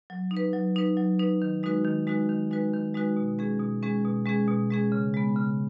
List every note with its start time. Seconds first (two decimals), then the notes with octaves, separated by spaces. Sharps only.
0.10 F#3
0.31 D#4
0.37 B4
0.53 F#3
0.76 D#4 B4
0.97 F#3
1.19 D#4 B4
1.42 D#3
1.63 G#3 D#4 F#4 B4
1.84 D#3
2.07 G#3 D#4 F#4 B4
2.29 D#3
2.51 G#3 D#4 F#4 B4
2.73 D#3
2.95 G#3 D#4 F#4 B4
3.17 B2
3.39 G#3 C#4 G#4
3.60 B2
3.83 G#3 C#4 G#4
4.05 B2
4.26 G#3 C#4 G#4
4.47 B2
4.70 G#3 C#4 G#4
4.92 C#3
5.14 G#3 B3
5.36 C#3